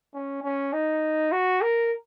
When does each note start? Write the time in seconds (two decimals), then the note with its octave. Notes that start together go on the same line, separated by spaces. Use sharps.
0.14 C#4
0.43 C#4
0.73 D#4
1.32 F#4
1.62 A#4